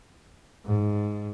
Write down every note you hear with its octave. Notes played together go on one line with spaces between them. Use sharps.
G#2